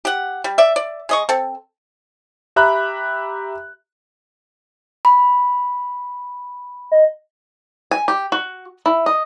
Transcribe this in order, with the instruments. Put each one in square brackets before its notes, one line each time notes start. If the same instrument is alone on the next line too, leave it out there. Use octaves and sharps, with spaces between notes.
[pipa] G4 F#5
G3
D5 E5
D5
G#3 D#5 C#6
C4 A4
[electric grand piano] G4 E5 A#5 B5 F#6
[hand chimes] B5
[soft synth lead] D#5
[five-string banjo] G#5
G4
F#4
E4
D#5